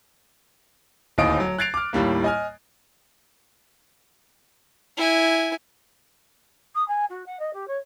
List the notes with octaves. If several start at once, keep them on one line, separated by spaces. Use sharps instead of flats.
D1 D#2 A2 D#5 D#6 D7
F#3
F#6 G#6 A6 C7 D7 F7
D6 F6
D#2 A2 G3 A#3
D#5 G#5 F6
E4 G#5
D#6
G#5
F#4
F#5
D#5
G4
C#5